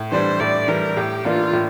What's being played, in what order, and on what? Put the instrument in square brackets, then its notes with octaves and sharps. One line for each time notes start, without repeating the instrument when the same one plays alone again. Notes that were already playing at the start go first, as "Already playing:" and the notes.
Already playing: [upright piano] A2
[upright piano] E3 G3 D4 [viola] C5
[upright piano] A2 [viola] D5
[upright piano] E3 G3 D4 [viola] A#4
[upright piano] A2 [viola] G4
[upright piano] E3 A#3 D4 [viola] F4
[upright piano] A2